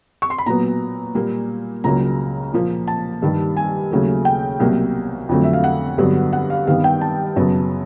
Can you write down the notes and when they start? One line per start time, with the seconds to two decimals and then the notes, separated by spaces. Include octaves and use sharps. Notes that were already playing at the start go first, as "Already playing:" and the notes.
0.22 C#6
0.30 C6
0.38 B5
0.46 A#2 F#3 B3 A#5
1.15 A#2 G3 A#3
1.84 C#2 C#3 F#3 A#3 A#5
2.53 A#2 F3 A#3
2.88 A5
3.22 G2 D#3 G3
3.57 G#5
3.91 D#2 C#3 F#3 A3
4.25 G5
4.60 C2 B2 F#3 A#3
5.29 F2 D3 F#3 A3
5.44 E5
5.53 F5
5.64 F#5
5.98 G2 D3 F#3 B3
6.33 F#5
6.50 F5
6.67 G2 D#3 G3 B3 F5
6.84 G5
7.01 A5
7.36 F#2 C#3 F#3 B3